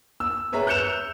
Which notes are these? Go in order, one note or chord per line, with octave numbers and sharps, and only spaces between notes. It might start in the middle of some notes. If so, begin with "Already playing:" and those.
E6
G#4 B4 C#5 E5 A#5
F#6 G6 C#7 E7 F7